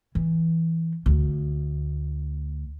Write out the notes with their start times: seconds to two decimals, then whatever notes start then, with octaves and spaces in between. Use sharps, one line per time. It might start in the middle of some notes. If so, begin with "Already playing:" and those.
0.15 E3
1.06 D2